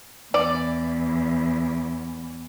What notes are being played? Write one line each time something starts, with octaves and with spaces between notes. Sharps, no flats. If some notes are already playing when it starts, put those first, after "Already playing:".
E2 D5